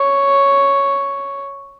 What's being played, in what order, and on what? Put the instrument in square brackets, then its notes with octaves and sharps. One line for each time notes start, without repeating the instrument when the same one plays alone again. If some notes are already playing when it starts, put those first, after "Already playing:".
Already playing: [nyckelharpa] C#5